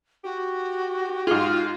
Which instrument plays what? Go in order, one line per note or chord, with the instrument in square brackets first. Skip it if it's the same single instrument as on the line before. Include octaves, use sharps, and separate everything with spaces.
[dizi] F#4 [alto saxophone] G4
[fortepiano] G#2 G#4 [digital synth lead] F4